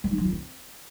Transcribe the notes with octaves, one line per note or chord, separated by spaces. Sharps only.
G3
D#4
F#3
F4
C4